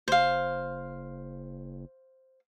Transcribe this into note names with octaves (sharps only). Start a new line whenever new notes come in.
F#1 C5 F5